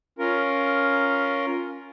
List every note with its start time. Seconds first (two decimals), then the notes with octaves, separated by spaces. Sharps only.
0.19 C#4 F4 A#4